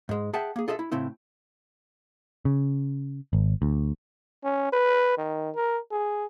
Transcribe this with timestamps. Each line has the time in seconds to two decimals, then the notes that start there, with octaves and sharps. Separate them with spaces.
0.09 G#2 G#3
0.33 G#4 E5 F#5 G5 A5
0.56 A#3 G#4
0.68 F4 G#4 A4 D#5 E5
0.79 E4
0.92 A2 C#3 C4 E4
2.45 C#3
3.33 G#1
3.62 D2
4.44 C#4
4.73 B4
5.18 D#3
5.55 A#4
5.91 G#4